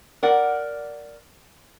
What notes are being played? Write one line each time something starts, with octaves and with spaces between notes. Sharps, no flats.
A#4 D5 F#5